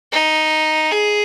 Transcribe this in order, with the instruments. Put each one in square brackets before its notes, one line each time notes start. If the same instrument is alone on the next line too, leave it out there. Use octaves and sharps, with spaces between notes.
[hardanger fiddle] D#4
G#4